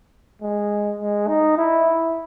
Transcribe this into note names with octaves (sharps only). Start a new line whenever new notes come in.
G#3
G#3
D#4
E4